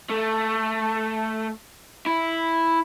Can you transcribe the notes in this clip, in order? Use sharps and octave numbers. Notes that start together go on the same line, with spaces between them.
A3
E4